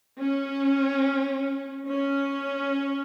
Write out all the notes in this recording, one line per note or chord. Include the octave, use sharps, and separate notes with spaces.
C#4
C#4